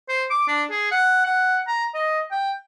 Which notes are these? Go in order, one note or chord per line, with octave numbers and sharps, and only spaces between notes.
C5
D6
D4
G#4
F#5
F#5
A#5
D#5
G5